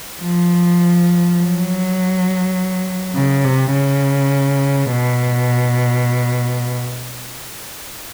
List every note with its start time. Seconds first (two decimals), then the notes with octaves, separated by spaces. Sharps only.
0.22 F3
1.39 F#3
3.15 C#3
3.44 C3
3.73 C#3
4.91 B2